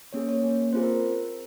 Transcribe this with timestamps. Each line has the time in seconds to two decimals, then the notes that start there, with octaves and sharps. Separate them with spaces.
0.13 A#3 C#4 G#4 C#5
0.29 C#5
0.43 A#3 C#4 G#4
0.73 C4 F4 G#4 C5
0.83 A#4